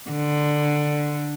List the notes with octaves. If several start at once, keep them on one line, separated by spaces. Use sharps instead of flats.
D3